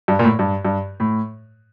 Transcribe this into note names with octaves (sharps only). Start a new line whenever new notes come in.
G2
A#2
A2
G2
G2
A2